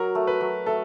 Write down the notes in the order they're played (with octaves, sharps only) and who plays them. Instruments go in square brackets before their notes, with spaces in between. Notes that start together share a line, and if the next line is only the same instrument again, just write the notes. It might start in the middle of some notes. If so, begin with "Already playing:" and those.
Already playing: [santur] F#3 [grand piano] A#4
[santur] A3
[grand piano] B4
[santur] F#3
[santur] A3 [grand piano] A4